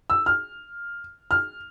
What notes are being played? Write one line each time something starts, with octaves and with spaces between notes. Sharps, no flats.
E6
F6
F6